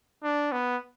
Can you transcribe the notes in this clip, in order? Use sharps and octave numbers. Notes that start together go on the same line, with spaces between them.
D4
B3